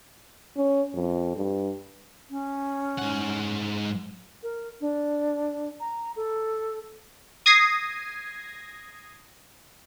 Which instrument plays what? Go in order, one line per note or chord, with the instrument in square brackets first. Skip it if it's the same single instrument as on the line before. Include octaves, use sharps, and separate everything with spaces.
[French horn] C#4
F2
G2
[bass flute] C#4
[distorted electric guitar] G#2 F#5
[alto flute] A#4
D4
A#5
A4
[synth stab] D#6 G#6 A#6 C7